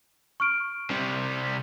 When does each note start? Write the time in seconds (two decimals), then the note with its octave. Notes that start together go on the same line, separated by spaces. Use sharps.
0.40 C#6 F6 D7
0.91 C3 G3